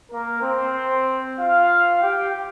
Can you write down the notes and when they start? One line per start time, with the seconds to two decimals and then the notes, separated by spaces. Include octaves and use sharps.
0.11 A#3 A#4
0.43 C4 C5
1.38 F4 F5
2.01 G4 G5